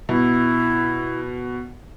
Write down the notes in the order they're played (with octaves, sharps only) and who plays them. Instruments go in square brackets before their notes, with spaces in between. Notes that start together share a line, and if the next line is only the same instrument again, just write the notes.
[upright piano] B2 [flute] E4